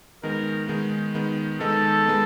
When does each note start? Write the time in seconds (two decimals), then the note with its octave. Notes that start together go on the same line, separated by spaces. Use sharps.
0.23 D#3 G#3 B3 D#4 A#4
0.68 D#3 G#3 B3 D#4
1.14 D#3 G#3 B3 D#4
1.60 D#3 G#3 B3 D#4 A4
2.06 G#3 B3 D#4